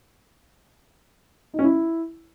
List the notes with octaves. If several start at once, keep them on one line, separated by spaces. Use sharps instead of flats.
D#4
C#4
E4